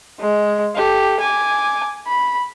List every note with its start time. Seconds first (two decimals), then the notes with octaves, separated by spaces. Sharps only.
0.20 G#3
0.75 G4 A4
1.20 G#5 D6
2.07 B5